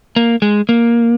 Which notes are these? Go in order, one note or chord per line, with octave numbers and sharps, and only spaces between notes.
A#3
G#3
A#3